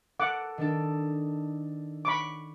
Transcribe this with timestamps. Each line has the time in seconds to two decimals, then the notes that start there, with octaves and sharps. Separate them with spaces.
0.20 A4 F#5 D6
0.58 D#3 D4 A4
2.05 B5 C#6 D6